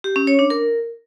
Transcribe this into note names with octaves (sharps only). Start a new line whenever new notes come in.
G4
C#4
C#5
D4
A#4